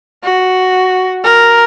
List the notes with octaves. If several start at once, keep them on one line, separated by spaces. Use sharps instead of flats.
F#4
A#4